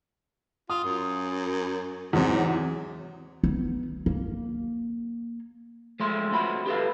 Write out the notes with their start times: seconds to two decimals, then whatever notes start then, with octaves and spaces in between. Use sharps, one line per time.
0.70 F4 D#6
0.84 F#2
2.13 E2 G#2 C3 F#3
3.43 B3
4.06 A#3
6.00 F3 G#3 A3 C6
6.31 F2 F3 F#4 A#5 B5
6.66 G4 A4 B4 F5